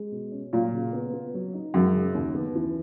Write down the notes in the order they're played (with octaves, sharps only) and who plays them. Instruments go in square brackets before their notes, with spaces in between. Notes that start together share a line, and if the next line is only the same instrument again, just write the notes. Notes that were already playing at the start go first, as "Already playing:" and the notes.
Already playing: [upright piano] G#3
B2
C#4
[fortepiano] A#2 [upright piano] F#3
[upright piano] C#3
B3
B3
F#3
D#4
[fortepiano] F#2 [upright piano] G#3
[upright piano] C#3
D#2
B3
E3